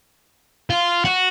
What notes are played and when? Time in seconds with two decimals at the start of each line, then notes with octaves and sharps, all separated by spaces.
0.70 F4
1.05 F#4